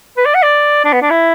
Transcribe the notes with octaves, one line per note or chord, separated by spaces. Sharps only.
B4
D5
F#5
D5
D4
B3
D4
E4